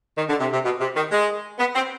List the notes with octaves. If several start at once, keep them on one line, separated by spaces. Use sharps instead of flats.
D#3
D3
C3
C3
B2
C3
D#3
G#3
B3
C4